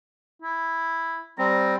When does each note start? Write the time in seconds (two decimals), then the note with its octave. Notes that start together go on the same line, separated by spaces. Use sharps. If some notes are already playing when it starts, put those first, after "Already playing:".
0.42 E4
1.38 G3 C4 A#5